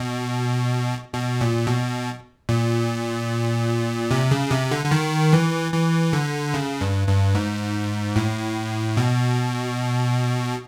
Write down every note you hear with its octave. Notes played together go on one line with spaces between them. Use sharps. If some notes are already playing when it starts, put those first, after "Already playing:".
Already playing: B2
B2
A#2
B2
A#2
C3
C#3
C3
D3
D3
D#3
E3
E3
D3
C#3
G2
G2
G#2
A2
B2